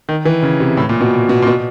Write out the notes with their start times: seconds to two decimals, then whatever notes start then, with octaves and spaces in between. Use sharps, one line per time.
0.09 D#3
0.25 E3
0.43 C#3
0.60 C3
0.77 A2
0.89 A#2
1.01 B2
1.29 B2
1.42 A#2
1.47 B2